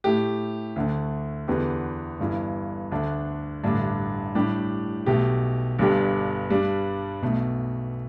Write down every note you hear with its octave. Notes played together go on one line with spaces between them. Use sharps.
A2 A3 G4
D2 D3 A3
E2 D3 B3 G4
G1 G2 E3
D2 D3 A3 D4
A1 G2 D3 A3 D4
A2 G3 D4 G4
B1 B2 A3 G4
G1 G2 G3 D4 G4
G2 G3 D4
B1 B2 A3